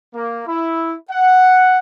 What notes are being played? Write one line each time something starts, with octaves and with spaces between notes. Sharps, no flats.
A#3
E4
F#5